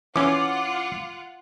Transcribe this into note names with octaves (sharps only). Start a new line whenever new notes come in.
E3 C#4 F4 F#5 D6